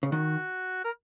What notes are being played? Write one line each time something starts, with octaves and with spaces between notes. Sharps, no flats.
C#3
D#3 F#4
A#4